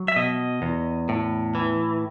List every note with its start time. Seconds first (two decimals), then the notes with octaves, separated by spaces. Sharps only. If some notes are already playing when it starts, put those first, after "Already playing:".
Already playing: F#3
0.08 E5
0.16 B2 D#5
0.62 E2
1.09 A2
1.55 E3